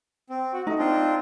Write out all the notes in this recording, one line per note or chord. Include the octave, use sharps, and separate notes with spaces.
C4
F#4
A3 D#4
C4 D4 F4